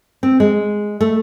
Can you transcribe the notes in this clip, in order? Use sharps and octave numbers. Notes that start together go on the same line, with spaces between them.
C4
G#3
A3